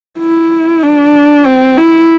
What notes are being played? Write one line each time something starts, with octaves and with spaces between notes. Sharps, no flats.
E4
D4
C4
E4